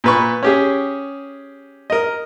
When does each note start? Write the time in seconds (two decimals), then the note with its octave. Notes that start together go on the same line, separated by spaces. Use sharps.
0.04 A#2 B4 C#6
0.43 C#4 G4 G#4
1.90 A#4 D#5